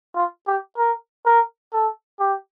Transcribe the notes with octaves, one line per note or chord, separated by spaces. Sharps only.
F4
G4
A#4
A#4
A4
G4